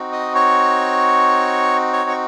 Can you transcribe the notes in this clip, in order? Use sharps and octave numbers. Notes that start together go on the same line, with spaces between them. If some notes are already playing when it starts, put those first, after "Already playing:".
Already playing: C4 D#4 F#4
D#5 D#6
C#5 C#6
C#5 C#6
C#6